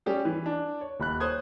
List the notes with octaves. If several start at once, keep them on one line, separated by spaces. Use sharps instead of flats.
G3 C#4 G4 G#4
E3
D4
C#5
D#1 B5 F#6
C5 C#5 D#6 F#6 G#6